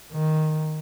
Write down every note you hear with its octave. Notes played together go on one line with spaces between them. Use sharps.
D#3